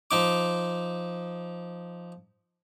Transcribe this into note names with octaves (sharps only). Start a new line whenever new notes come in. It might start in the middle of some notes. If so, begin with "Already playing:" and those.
F3 D#4 D6